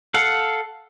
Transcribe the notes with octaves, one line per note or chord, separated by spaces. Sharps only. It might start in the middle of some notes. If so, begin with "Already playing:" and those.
A4 F5 F#5